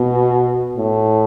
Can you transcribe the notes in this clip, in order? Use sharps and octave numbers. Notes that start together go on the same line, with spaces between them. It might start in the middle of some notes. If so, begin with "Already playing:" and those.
Already playing: B2
A2